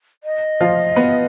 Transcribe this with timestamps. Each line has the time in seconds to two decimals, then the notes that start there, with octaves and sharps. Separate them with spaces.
0.24 D#5
0.61 F3 F4
0.96 B3 B4